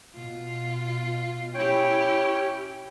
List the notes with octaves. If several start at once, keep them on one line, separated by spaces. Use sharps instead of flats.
B2 F4
C#4 E4 G4 C#5 G5